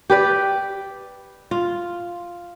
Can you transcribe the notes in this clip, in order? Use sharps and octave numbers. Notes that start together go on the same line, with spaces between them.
G4 B4 D5
F4